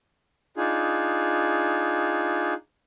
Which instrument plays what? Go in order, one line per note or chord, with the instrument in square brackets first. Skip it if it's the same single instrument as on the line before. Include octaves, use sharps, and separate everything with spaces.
[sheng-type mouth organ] D4 D#4 F4 G#4